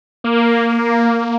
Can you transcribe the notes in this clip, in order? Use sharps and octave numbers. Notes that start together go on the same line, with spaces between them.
A#3